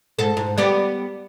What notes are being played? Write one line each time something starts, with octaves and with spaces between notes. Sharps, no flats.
G#2 A4
G#2
G3 B3 G4